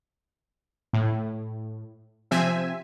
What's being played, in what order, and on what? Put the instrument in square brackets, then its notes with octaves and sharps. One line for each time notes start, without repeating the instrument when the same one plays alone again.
[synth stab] A2
C3 F3 C4 E5 G#5